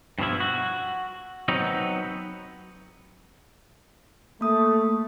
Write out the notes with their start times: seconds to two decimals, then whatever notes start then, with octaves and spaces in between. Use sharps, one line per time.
0.18 G2 B2 F3 E4
0.40 F#4
1.48 F#3 B3 C4 D#4
4.41 A3 A#3 D#6